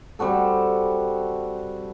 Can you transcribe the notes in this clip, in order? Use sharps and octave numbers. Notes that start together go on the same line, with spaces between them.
G3 C4 F#4 A4